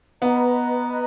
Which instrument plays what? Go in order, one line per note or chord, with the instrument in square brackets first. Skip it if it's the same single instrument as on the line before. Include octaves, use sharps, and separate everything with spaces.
[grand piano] B3 [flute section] B4 D#5 A#5
[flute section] B4 D#5 A#5